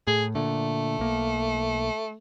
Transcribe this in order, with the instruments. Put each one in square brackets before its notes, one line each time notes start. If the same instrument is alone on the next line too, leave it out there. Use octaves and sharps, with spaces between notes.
[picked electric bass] A2 [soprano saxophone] G#4
[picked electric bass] A#2 D3 [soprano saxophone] A3
[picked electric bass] B1 A#3